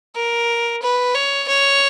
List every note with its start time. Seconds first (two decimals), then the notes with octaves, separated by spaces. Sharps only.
0.16 A#4
0.82 B4
1.14 C#5
1.48 C#5